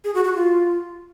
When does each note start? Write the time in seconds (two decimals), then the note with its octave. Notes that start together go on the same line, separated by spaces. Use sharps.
0.04 G#4
0.14 F#4
0.24 F#4
0.34 F4